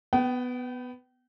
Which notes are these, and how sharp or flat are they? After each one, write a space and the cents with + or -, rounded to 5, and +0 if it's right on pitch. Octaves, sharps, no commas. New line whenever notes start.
B3 +10 G5 -35